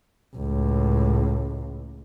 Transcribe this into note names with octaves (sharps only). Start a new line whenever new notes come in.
C#2 A2